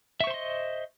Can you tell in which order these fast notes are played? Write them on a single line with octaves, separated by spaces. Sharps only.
E5 C#6 C5 C6 D#5